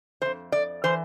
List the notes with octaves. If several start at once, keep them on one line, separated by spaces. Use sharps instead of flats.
F2 E3 C5
D5
E3 C5